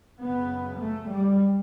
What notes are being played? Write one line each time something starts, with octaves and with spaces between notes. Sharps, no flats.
F#2 C#3 B3
A3
G3